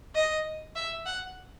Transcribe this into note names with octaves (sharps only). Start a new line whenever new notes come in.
D#5
E5
F#5